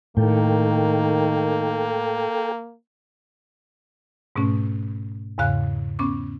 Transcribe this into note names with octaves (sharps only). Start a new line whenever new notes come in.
A2 D#3 A#3 A4 G5
G#2 B2 A3 C#4
E2 G#2 C#3 F5 F#6
B3 C#4 D6